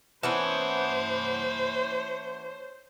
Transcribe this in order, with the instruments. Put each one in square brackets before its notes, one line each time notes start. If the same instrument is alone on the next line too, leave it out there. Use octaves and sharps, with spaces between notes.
[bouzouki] E3 B3 C#4 [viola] C5 [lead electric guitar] C#5 A5